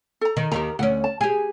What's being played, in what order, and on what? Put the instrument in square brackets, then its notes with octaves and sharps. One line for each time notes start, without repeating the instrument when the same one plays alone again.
[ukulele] A4 A#5
[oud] D#3 [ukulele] D#5
[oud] D#2 D#3 G4 [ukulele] A#5
[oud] D2 C#4 [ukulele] F#5
[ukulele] A5
[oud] G4 G#4 [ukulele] G#5